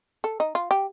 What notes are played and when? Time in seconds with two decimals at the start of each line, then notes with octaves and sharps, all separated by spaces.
0.24 A4
0.40 D#4
0.55 F4
0.71 G4